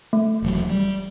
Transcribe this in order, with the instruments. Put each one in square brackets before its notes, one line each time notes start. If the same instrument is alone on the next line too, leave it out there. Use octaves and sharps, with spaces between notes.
[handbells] A3
[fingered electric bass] D#1 E3 F#3
G3